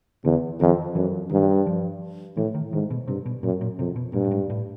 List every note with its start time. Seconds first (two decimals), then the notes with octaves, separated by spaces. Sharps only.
0.25 E2 D3
0.60 F2 D#3
0.95 F#2 E3
1.30 G2 D#3
1.66 F3
2.37 A2 E3
2.54 D#3
2.73 G#2 D#3
2.90 B2
3.07 G2 C3
3.26 B2
3.43 F#2 A#2
3.61 A#2
3.79 F2 C3
3.96 B2
4.13 G2 A#2
4.24 A2
4.31 G#2
4.50 A2